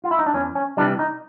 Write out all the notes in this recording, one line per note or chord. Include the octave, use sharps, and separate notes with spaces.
F4
E4
D#4
D4
E2 C#4
C#4
C3 E3 G3 D4
D#4